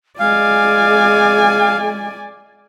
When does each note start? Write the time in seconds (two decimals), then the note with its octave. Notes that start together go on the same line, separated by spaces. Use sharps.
0.20 G#3 D5 F5 G#5